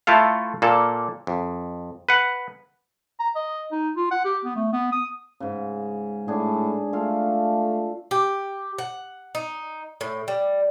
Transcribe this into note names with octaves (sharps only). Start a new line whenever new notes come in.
A3 E4 F4 A4 F5
A#2 A#3 A4
F2
B4 F#5
A#5
D#5
D#4
F4
F#5
G4
B3
A3
B3
D#6
G#2 C#3
A2 D4 G#4
A3 F4 A4 F5
G4
F#5
D#4
A2
G3